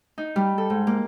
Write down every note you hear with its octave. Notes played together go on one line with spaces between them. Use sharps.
D#4
G3
A4
G#2
A#3